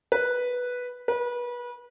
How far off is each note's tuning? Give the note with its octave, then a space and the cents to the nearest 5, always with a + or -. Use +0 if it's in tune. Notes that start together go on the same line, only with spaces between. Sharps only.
B4 -5
B4 -30